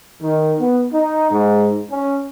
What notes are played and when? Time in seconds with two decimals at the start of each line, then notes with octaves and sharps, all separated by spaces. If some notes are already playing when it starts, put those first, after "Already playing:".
0.22 D#3
0.59 B3
0.93 D#4
1.31 G#2
1.91 C#4